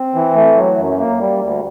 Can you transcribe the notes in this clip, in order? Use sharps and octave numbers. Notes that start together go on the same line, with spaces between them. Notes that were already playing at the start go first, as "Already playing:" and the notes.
Already playing: C4
E3
A3
F#3
F#2
A#3
G3
D2